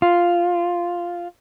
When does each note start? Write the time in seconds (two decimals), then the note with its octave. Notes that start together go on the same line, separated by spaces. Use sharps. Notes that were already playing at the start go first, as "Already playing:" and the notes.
0.02 F4